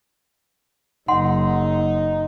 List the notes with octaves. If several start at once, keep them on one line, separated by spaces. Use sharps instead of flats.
F#1 D#4 F#5 C6